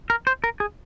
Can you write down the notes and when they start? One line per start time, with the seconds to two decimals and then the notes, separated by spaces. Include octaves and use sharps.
0.10 A#4
0.27 C5
0.44 A#4
0.60 G#4